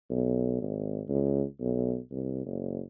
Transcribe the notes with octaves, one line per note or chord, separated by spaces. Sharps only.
B1
G#1
C#2
B1
C2
F#1